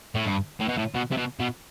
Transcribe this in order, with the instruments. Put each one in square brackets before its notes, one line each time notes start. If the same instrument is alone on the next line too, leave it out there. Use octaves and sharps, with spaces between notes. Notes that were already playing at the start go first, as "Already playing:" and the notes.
[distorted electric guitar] A2
G2
A2
B2
A2
B2
C3
B2
B2